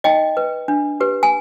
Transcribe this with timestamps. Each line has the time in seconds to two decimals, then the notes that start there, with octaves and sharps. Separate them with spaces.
0.04 D#4 D#5 G5
0.37 B4
0.68 D4
1.00 G4 B4
1.23 G#5